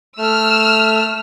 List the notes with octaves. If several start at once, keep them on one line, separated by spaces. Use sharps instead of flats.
A3 E6 F6